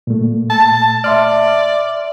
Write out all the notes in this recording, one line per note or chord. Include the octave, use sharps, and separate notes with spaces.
A#2 A3
A5
D5 E5 C6 F6